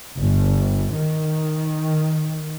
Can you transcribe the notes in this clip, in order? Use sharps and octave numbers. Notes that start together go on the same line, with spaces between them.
G1
D#3